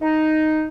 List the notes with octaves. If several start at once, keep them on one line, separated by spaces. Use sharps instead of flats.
D#4